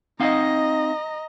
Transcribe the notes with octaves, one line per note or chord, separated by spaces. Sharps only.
C4 D#4 D#5 F5 A#5